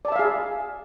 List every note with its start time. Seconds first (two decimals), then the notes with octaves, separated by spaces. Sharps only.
0.05 D5
0.08 A5
0.12 E5
0.16 F5
0.19 G#4